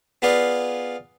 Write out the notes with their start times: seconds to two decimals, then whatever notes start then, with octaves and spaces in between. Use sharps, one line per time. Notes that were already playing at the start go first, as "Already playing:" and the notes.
0.22 B3 F4 G#4 B4 D5 F5